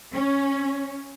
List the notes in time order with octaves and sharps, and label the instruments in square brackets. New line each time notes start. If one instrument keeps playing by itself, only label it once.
[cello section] C#4